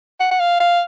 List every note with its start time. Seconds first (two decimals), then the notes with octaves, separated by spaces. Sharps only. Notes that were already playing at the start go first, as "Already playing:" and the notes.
0.20 F#5
0.31 F#5
0.40 F5
0.60 F5